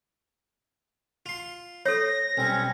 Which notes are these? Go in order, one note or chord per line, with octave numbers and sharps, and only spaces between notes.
F4 C6
A4 C5 C#5 A#6
B1 G3 C4 C#4